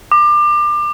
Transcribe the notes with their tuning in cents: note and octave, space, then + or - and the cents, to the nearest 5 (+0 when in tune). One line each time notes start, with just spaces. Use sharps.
D6 +30